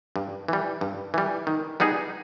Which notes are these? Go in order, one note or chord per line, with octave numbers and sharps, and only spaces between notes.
G2
E3 G3
G2
E3 G3
D#3
G3 B3 D#4 G#4